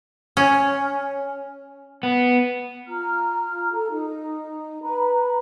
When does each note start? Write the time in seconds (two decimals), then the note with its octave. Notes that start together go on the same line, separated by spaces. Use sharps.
0.37 C#4
2.03 B3
2.88 F4 A#5 F6
3.72 A4 A#5
3.90 D#4
4.82 B4 A#5 B5